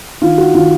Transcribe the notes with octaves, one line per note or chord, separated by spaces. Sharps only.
D#3 F4
F#4
D#3 F4